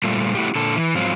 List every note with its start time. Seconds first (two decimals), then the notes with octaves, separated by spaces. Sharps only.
0.04 A#2 G3 A3 F4
0.35 A3 E4 F#4 G4
0.55 A#2 D3 A4
0.76 E3
0.95 G#2 F3 F#3 C4 F4